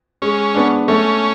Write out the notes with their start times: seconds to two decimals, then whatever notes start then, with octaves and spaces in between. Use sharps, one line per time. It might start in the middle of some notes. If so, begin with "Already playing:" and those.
0.22 G#3 C#4
0.55 B3 D4
0.88 A3 C#4